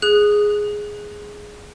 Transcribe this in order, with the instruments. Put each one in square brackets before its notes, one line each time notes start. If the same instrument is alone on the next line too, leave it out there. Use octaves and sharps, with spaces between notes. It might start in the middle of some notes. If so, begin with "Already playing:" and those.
[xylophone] G#4 F#6